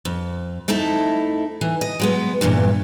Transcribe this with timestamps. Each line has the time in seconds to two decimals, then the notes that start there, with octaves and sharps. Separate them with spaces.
0.05 F2
0.68 F2 A3 D#4 E4 A5
1.61 E3
1.81 D#5
2.00 F#3 G#3 B3
2.41 E2 G2 A#2 E3